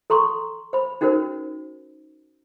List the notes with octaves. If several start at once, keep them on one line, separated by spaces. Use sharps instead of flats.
A4 A#5 C6 C#6
C5 B5
C#4 D#4 F#4 A#4 C5